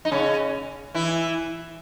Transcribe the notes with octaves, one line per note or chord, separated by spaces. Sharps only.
D#4
C#3 C#4
E3 E4